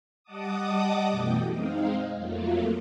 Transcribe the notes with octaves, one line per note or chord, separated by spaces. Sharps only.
G3 D#5 F#5 A5 D6 D#6
F#2 B2 E3 A3 G5
G#3 C4 D#4 F5
F2 F#3 A3 A#3 F4